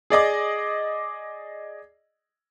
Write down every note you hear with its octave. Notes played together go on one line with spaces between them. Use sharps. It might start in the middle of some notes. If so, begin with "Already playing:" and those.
G#4 D5 D#5 D6